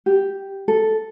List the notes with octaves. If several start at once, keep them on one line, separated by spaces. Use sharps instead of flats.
G4
A4